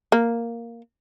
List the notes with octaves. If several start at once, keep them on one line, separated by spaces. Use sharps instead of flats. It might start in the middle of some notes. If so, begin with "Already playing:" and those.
A#3